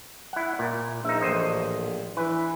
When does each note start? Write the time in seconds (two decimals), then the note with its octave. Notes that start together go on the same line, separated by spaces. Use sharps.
0.33 E4 F#5
0.59 A#2
1.05 A#1 D#4 E5
1.21 A1 C5 D#5
2.17 E3 B4